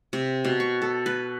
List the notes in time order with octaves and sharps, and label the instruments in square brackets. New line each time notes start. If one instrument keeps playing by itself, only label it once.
[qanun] C3
B2
C#6
A4
B4